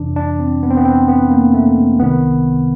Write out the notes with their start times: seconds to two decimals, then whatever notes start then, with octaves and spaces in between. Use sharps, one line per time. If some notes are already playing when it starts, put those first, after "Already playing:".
Already playing: F2 C3 E3 D4
0.16 D4
0.40 C4
0.63 B3
0.70 C4
0.77 B3
0.85 C4
1.08 B3
1.30 A#3
1.54 A3
2.00 C2 C3 D#3 B3